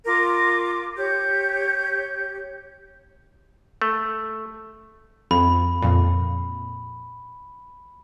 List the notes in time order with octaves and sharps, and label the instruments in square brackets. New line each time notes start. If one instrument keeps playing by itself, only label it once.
[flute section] F4 A#4 D6
G4 C#5 G6
[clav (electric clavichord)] A3
[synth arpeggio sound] F2 [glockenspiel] B5
[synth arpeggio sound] F2 A#2